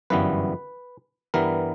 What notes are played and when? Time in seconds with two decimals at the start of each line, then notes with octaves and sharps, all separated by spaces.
0.10 G1 F#2 E3 G3 B3 B4
1.34 G2 E3 G3 B3 A#4